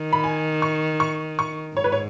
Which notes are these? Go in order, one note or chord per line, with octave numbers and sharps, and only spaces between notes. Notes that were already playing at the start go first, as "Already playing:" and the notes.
Already playing: D#3
B5
G#5
C#6
C#6
C#6
G#2 C#5
B4
C#5